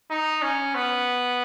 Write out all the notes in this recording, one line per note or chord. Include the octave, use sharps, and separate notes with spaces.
D#4
C#4
B3